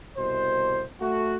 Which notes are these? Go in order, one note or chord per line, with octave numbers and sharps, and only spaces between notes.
C2 B2 C5
A3 F#4